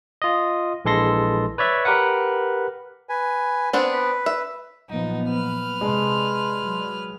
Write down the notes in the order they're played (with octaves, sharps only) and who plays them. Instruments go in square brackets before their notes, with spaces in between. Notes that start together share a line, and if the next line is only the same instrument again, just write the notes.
[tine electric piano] F4 D#5
A#1 E3 G#3 A4 C6 A#6
B4 C#5 D5 E5
G4 A#4 B4 F#5
[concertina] B4 G#5
[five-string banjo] B3 C4 D4
[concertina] B4
[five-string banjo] E5
[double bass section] A#2 F3 B3 [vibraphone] F#3 A#3 [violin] D#4
[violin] B4 F6
[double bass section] C3 [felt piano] G#3 [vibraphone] D5 A5 C6
[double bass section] F#3